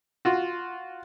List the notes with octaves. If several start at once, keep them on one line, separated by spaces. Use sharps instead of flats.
F4 F#4